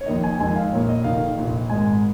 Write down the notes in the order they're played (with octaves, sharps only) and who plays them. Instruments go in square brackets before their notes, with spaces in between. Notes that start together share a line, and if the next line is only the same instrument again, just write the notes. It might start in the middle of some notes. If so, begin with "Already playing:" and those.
[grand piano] C#5
F2 D#3 A#3 D#5
G#5
F2 D#3 G#3 G#5
F5
A#1 A#2 A#3 C#5
D#5
F1 D#2 D#3 F5
A#1 A#2 F3
G#1 G#2 G#3 G#5